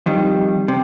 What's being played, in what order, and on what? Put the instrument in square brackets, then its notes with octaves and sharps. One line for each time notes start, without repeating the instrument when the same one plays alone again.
[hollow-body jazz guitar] F2 D#3 G3
C3